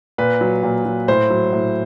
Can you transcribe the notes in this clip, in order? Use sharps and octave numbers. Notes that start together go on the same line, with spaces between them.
A#2 B4
F#3
A#2
F#3
A2 C5
F#3
A2